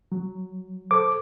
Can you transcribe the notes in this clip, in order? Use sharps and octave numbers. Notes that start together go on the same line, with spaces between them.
F#3
A4 C5 D6